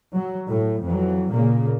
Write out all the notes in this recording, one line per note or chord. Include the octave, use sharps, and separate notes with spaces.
F#3
A2
F2 E3 F#3
A#2 C#3 A#3